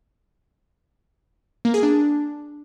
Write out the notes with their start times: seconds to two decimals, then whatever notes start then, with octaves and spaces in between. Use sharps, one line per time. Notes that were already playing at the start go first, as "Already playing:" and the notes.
1.65 A#3
1.74 G#4
1.83 D4